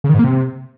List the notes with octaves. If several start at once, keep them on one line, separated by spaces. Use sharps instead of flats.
C#3
D#3
G#2
A#3
C3